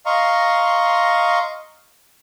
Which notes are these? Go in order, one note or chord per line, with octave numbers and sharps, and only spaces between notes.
D#5 F5 A#5 C6 C#6